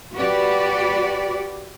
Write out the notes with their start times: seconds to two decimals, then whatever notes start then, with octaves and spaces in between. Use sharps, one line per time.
0.14 F#4 G4 B4 D5